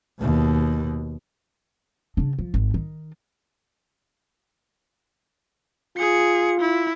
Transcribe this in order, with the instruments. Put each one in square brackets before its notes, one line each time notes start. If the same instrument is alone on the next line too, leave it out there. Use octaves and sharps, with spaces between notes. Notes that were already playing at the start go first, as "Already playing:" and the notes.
[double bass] D#2 B2
[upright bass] C#3 D4
F3
G#1
D#3
[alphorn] F4 [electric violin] G#4 C#7
[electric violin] E4